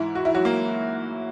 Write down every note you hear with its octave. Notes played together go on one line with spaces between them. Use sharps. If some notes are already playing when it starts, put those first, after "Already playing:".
Already playing: G#2 E3 E4
F#4
E3 E4
F#3 F#4
A#3